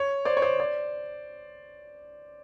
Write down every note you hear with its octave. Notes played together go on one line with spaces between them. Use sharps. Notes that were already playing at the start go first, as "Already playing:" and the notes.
Already playing: C#5
C5 D5
C#5
C5 D5
C5 D5